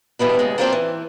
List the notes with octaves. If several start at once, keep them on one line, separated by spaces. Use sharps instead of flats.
G2 B2 E3 B3 D4
D#2 C#3 G#3
F3 F#3 A#3 C4 D4 F4
E3